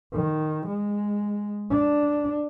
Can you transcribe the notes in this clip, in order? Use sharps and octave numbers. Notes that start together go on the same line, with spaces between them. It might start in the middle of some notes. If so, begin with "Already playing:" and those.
D#3
G#3
D4